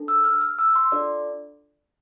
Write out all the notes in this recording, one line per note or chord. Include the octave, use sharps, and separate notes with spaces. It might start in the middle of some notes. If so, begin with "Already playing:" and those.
Already playing: D4 A4
E6
F6
F6
E6
C6
D4 F4 A4 D5